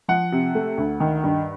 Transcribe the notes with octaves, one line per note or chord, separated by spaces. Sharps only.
F3 F#5
C3
A3
D2
D#3
G2